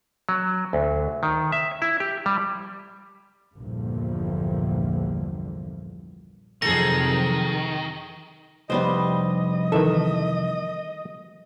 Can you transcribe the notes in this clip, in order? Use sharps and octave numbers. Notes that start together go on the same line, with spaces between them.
F#3
D2
D#3
E5
E4
G4
G3
A#1 E2 G2 A#2 D3
F2 C3 D#3 F#3 G#4 A4 A#6
C2 F2 G3 B3 C5 D#5
D#3 E3 A4 E5